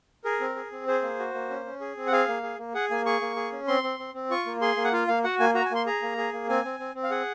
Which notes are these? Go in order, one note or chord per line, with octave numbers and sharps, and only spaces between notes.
G#4 A#4
C4
G#4
C4
G#4 C5
A#3
F#4
A#3
C#4
C#4
G#4
C4
F#5
G#4 F5
A#3
G#4
A#3
G#4 F#5
A#3 G#5
G#4 C#6
A#3
G#4
C#4
C4 C6
C4
C4
C4
F4 C#6
A#3
G#4 C6
A#3
F#5
F4 F5
A#3 F5
F#4 F#5
A#3 G#5
F#4 A#5
G#5
A#3 C6
G#4 A#5
A#3
G#4
A#3
C4 G#5
C4
C4
C4
F5
G#4 F#5